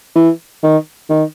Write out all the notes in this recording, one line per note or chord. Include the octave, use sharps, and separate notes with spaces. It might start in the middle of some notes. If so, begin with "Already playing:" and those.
E3
D#3
D#3